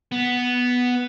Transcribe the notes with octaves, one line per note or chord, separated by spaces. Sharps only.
B3